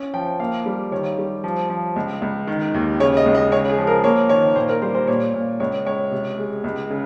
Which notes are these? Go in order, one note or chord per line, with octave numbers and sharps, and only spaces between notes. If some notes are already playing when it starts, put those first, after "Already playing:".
Already playing: C#4
F3 G5
A#3 F5
G3
D#3 C#5
G3
F3
F3
C#2
C#2
D#3
D#2
C#3 C#5
D#5
C#2
D#5
C#3 C#5
G#4
F3
A#4
A#3 C#5
D#3 C#5
A#2 C5
A#4
G3 C5
C5
A#2 C#5
A#2
C#2 C#5
C#2 C#5
C3
G#3
C#2
C#3